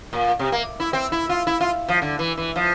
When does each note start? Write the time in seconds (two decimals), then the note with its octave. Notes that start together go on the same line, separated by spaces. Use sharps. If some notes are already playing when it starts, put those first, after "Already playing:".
0.13 A#2
0.39 C3
0.52 A#3
0.80 E4
0.93 C4
1.12 E4
1.29 F4
1.47 E4
1.61 F4
1.88 F3
2.02 D3
2.19 E3
2.37 E3
2.56 F3